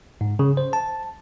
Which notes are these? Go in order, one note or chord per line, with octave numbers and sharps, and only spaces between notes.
G#2
C#3
C5
A5